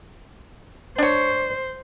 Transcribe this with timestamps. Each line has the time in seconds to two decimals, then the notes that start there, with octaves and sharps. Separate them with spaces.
0.98 D4 C5 C#5